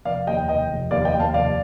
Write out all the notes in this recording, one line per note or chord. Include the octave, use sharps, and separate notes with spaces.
F1 D5 F5
D#2 D#5 G5
F1 D#5 G5
F1
D#2 D5 F5
D#5 G5
D#2
F5 A5
F1 D5 F5